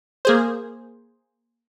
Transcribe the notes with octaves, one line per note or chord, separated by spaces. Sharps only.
A#3 G#4 C5